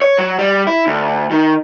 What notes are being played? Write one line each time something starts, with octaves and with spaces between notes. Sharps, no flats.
C#5
F#3
G3
E4
D2
D#3